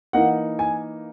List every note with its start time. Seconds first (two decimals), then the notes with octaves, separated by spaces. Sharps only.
0.13 E3 A#3 D#4 F#5
0.59 G#5